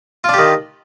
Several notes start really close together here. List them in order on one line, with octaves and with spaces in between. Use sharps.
F4 D4 G4 D#3